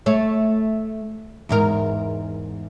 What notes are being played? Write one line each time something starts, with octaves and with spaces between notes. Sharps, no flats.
A3 C#5
E2 G#2 A#4